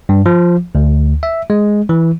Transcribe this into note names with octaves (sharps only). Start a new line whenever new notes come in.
G2
F3
D2
E5
G#3
E3